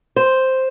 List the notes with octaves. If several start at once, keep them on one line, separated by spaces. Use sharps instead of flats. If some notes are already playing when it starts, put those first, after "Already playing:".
C5